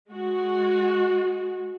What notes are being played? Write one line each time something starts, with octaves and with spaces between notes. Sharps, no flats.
G#3 F#4